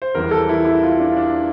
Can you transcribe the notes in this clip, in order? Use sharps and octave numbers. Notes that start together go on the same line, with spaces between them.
C5
E2 E3 G3 A#4
A4
E4
E4
F4
D4
D4